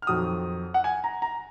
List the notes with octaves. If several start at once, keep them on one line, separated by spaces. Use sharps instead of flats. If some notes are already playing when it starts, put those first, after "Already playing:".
F6
F2 D#3 F#3 D#6
F#5
G#5
A#5
A#5